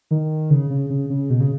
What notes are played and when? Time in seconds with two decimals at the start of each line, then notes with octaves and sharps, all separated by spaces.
0.11 D#3
0.50 C#3
0.70 C#3
0.90 C#3
1.10 C#3
1.30 B2
1.40 C#3